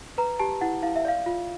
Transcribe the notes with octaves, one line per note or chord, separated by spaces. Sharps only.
B4 A#5
G4 A5
E4 F#5
E4 F5
E5
D5 F5
F4